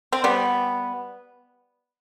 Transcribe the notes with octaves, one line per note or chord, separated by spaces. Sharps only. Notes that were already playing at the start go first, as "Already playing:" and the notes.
C4
G3 B3